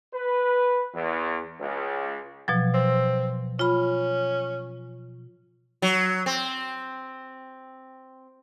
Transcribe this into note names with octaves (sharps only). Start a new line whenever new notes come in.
B4
E2
C#2
B2 F3 F#3
C4
C#4 F4 B5
F#3
C4